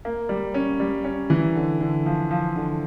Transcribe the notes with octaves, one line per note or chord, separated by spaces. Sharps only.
A#3
G3
C#4
G3
C#4
E3
D3
D3
F3
F3
D3